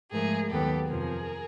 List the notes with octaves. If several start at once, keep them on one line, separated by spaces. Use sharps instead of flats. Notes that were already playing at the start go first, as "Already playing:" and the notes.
G#2 F3 A3 G#4 A#4
D#2 D#3 F#3 B3 G4 A4
F2 C3 F3 G#4 A#4